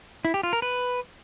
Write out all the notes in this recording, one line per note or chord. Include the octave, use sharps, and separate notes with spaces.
E4
G4
F4
A#4
B4